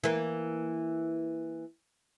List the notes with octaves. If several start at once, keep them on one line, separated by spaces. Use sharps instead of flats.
E3 A#3